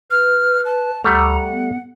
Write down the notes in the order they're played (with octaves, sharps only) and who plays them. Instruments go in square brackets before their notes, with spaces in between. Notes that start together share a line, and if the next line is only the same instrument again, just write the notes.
[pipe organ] B4 [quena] F6
[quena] A5
[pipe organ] D2 A#5 [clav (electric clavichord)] G3 A3 [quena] F#5
[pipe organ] B3